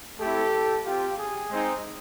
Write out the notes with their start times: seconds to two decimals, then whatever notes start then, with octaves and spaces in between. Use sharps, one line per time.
0.20 A3 C4 E4 G4 A4
0.85 C4 F4 G4
1.18 G#4
1.51 G#3 C4 D#4